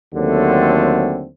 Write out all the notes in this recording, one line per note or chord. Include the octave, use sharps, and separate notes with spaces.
D#2 D3 F#3 A3 C4